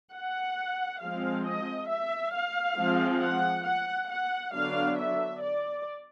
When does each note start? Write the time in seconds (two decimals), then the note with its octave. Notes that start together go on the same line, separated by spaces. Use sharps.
0.14 F#5
1.01 F3 G#3 C4 F5
1.46 D#5
1.89 E5
2.34 F5
2.78 F3 G#3 C4
3.22 F#5
3.66 F#5
4.10 F#5
4.54 D3 F#3 B3 D4 F5
4.98 E5
5.41 D5